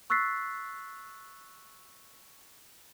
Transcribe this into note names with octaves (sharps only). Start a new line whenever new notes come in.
C#6 E6 F#6 A6 B6 C7